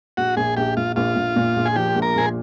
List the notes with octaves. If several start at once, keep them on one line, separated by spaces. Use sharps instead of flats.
A#1 F#4
A#1 G#4
A#1 G4
A#1 F4
A#1 F4
A#1
A#2
A#1
G#4
F3 G4
A#1
A#4
A#1 G#4